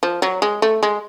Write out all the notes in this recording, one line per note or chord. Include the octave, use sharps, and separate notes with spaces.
F3
F#3
G#3
A3
G#3